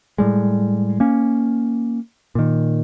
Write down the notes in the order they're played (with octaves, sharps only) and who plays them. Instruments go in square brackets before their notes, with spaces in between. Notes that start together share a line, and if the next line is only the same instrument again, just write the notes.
[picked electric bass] A2 G3 G#3
A#3 C#4
A#2 D#3